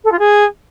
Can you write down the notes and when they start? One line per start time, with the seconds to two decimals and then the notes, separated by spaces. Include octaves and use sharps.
0.04 A4
0.12 F4
0.19 G#4